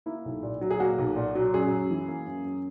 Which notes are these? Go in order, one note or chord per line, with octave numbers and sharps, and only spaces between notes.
A#3 E4
B1
A#2
F#3
G#4
A#3 F#4
B1
A#2
F#3
F#2 G#4
F#2
E3
A#3
F#2
F#2